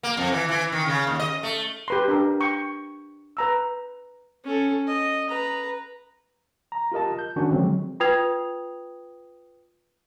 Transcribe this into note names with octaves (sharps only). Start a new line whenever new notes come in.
A#3
F2
E3
E3
D#3
C#3
D#2
D#5
A3
G4 B4 C6
D4 G4 A#4
G5 C#6
B4 A#5 E6
C#4 A4
D#5
B4 A#5
A#5
F4 G4 A#4 D#5 A5
G6
D#3 C#4 D4 F#4
D3 F3 F#3 G#3 C4
F4 B4 G5 D#6 G#6 F7